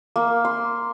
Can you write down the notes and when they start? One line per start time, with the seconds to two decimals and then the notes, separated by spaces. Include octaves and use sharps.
0.16 A#3
0.45 C6